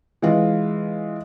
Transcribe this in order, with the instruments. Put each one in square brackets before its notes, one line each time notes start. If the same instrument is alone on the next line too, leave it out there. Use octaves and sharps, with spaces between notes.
[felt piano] E3 G#3 F4